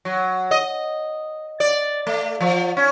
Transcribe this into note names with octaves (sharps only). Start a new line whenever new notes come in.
F#3
D#5
D5
A3
F3
C#4